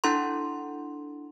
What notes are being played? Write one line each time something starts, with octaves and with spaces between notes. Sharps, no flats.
D4 E4 A4 F#5 A#5 C6